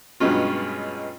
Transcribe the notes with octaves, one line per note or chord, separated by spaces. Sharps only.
G2 B2 F#3 G#3 C#4 F4